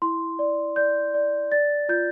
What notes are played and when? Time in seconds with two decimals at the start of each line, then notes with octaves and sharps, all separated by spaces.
0.02 E4 C6
0.39 D5
0.76 D5 G6
1.14 D5
1.52 D5 A6
1.89 F4 G6